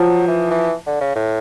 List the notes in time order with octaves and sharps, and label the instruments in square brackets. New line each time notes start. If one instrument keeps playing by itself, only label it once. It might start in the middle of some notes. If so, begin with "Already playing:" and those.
Already playing: [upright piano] F3 [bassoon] F#3
[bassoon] E3
E3
D3
C#3
A2